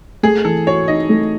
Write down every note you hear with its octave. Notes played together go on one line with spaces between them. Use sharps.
A3 G#4
E3 A4
F#4 C#5
D#4 D#5
A3